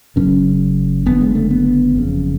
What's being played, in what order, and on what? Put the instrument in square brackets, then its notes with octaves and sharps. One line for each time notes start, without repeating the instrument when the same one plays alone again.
[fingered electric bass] F#1 F#2 C#3 C#4
F#1 F#2 D3 B3
G#3
A3
B3
F#1 F2 C#3